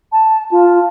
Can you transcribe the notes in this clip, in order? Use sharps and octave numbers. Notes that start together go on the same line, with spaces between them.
A5
F4